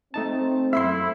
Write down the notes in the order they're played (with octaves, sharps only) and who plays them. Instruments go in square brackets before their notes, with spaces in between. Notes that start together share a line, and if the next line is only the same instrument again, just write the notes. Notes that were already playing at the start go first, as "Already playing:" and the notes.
[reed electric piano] A3 D#4 A5 [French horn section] C4
[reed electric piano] F#2 A3 [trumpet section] E4 [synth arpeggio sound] E5 B5 C6